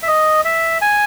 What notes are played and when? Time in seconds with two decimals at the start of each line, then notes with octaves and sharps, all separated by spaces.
0.03 E5
0.08 D#5
0.45 E5
0.82 G#5